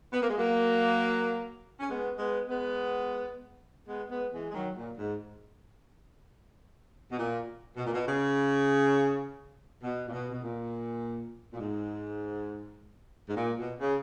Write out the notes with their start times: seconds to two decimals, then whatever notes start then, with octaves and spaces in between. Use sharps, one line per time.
0.13 B3
0.21 A#3
0.29 G#3
0.37 F#3 A#3
1.80 C#4
1.89 G#3 B3
2.18 G#3 B3
2.48 G#3 B3
3.88 G#3 B3
4.10 G#3 B3
4.32 E3 G#3
4.50 G#3
4.54 D#3 F#3
4.76 A#2
4.98 G#2
7.11 B2
7.18 A#2
7.77 B2
7.85 A#2
7.93 B2
8.06 C#3
9.83 B2
10.08 A#2
10.12 B2
10.30 B2
10.42 A#2
11.53 A#2
11.58 G#2
13.28 G#2
13.36 A#2
13.58 B2
13.80 C#3